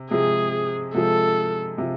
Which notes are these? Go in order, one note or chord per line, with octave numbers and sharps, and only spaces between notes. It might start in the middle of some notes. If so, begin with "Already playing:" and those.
Already playing: C3
C3 F3 G#3 G#4
C3 F3 G#3 A4
C3 F3